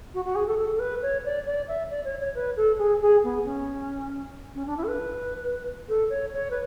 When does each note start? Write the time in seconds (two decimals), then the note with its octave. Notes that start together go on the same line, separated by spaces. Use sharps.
0.14 F#4
0.25 F#4
0.35 G#4
0.47 A4
0.58 A4
0.75 A4
0.79 B4
1.02 C#5
1.25 D5
1.46 D5
1.68 E5
1.90 D5
2.05 C#5
2.20 C#5
2.35 B4
2.56 A4
2.78 G#4
3.01 G#4
3.23 B3
3.44 C#4
4.55 C#4
4.66 D4
4.77 E4
4.83 A4
4.88 B4
5.89 A4
6.10 C#5
6.33 C#5
6.51 B4